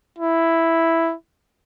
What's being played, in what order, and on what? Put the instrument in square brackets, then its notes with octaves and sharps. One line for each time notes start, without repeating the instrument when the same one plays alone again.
[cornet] E4